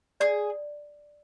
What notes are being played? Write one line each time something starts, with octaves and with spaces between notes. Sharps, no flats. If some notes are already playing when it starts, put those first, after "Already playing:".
G#4 D5